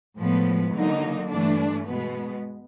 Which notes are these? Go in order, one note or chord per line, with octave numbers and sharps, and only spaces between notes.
A2 F3 G#3 B3
D3 F#3 A#3 D#4
G2 E3 A3 D4
B2 G#3 B3